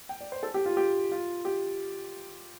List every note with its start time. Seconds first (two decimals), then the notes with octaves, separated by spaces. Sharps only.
0.09 G5
0.21 D5
0.32 C5
0.43 A4
0.54 G4
0.66 F4
0.77 G4
1.12 F4
1.45 G4